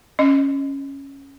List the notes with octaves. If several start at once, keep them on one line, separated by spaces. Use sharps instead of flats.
C#4 D#5